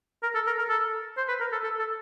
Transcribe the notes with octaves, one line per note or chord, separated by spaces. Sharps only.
A#4
A4
A#4
A#4
A4
C5
B4
A#4
A4
A4
A4